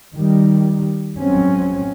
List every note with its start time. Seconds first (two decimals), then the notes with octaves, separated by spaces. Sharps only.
0.14 D#3 G3
1.17 F#2 F3 F#3 G#3 C4 C#4